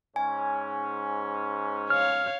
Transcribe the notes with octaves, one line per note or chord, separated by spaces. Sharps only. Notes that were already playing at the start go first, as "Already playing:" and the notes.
G#2 C#4 G#5
C#5 F5 F6